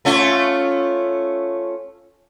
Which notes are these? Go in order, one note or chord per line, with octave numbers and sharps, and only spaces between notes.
A3 C#4 F4